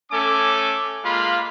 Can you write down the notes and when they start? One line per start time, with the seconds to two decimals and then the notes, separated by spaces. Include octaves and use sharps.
0.11 A3 C#4 A4 G#5 D6
1.04 G#3 A#3 F4 F5 B5